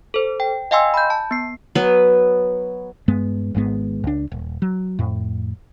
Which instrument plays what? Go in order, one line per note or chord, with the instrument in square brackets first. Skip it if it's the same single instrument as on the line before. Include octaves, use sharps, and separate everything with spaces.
[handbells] A4 C5
G5
D#5 F5 G5 G#5 C6 E6
B5 G6
A5
B3 C7
[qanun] F#3 B3 B4
[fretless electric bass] G2 G#3 B3
G#1 G#2 G#3 B3
C#2 D4
D#1
F#3
F2 A2